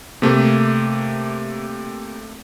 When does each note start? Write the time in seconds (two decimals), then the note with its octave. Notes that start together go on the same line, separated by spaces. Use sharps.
0.22 C3 A3 A#3